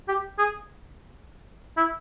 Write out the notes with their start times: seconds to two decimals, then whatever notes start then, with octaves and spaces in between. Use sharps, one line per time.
0.08 G4
0.39 G#4
1.77 E4